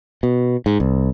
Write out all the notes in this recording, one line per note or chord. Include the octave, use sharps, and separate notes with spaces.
B2
G#2
C2